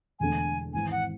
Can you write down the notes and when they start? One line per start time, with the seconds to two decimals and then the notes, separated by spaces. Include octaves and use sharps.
0.20 E1 E2 D3 A3 D4 G#5
0.74 G#1 G#2 E3 G#5
0.91 F#5